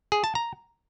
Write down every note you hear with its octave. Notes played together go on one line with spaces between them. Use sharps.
G#4
A5
A#5